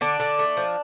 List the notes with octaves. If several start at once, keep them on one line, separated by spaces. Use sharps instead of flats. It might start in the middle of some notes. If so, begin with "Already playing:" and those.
D3 D4
D3
A3
F3